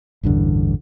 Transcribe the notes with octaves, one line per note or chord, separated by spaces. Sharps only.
A1 E2 G2 D3